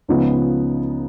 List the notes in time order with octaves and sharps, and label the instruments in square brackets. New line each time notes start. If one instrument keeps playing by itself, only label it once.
[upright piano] C#2 C#3 F3 B3 D#4